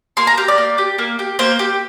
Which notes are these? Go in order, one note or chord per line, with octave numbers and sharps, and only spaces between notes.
A#3 C6
A#5
G4 F5
D5
A#3
G4
A#3
G4
A#3 C5
G4